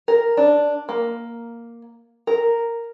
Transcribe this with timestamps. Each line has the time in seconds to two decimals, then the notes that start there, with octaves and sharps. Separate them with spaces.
0.08 A#4
0.37 D4
0.89 A#3
2.27 A#4